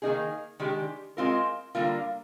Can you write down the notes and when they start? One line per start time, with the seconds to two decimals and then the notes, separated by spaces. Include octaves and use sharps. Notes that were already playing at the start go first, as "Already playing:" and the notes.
0.02 D#3 A#3 D#4 G#4
0.60 D#3 G#3 D4 G4
1.17 G#3 C4 F4 A#4
1.75 D3 G3 A#3 F4 A#4